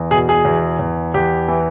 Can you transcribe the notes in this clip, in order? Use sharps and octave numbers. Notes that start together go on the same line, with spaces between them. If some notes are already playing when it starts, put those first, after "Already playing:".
Already playing: E2
B2 G#4
G#4
E2
E2
E2 G4
E3